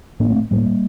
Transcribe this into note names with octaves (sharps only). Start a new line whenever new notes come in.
A2 A#3 D4
A3 C4
A2 G3 A#3